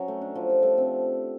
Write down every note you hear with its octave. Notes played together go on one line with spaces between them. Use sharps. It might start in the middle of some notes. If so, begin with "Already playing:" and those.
Already playing: F#3 C#4
A3
D4
F3
G4
A3
C4